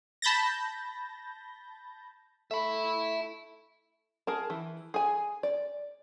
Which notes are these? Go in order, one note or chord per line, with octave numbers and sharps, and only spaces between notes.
A5 B5 G6 A6 A#6
A3 E5 B5
G#4 A#4 A5
E3
G#4 G#5
D5